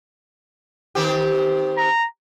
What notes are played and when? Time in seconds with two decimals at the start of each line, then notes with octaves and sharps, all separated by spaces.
0.95 D#3 C4 G4
1.77 A#5